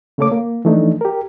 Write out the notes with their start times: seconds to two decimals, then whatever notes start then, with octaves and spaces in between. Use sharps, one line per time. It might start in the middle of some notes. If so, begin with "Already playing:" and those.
0.18 C#3 A3 A#3 A4 C#5 D6
0.32 A#3
0.65 E3 F3 A3 D4 D#4
1.01 G4 A#4